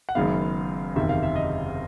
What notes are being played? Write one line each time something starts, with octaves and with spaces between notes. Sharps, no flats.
F#5
F#1 F#2 D#3 G#3 B3 F5
F#1 E2 C3 D#3 E5
F5
E5
D#5